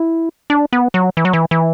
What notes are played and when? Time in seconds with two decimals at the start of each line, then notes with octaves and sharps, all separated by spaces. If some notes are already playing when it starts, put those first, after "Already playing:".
Already playing: E4
0.50 D4
0.73 B3
0.94 F#3
1.17 E3
1.25 F#3
1.33 E3
1.51 E3